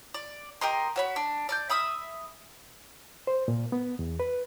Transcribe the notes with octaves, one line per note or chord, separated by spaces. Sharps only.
D5
G4 A#4 D#5 C6
F#4 C#5 B5
D4
D5 D6 G6
E5 B5 D#6 E6
C5
A#2
B3
E2
B4